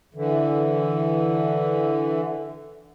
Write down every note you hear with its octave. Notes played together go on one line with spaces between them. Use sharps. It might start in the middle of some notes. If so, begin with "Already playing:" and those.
D3 E3